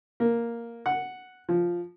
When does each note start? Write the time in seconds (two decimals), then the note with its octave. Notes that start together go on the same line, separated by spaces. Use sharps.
0.20 A#3
0.86 F#5
1.49 F3